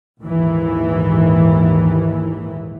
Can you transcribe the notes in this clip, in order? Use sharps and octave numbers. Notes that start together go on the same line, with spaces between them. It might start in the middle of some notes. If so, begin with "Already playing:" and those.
A#1 D#2 G#2 E3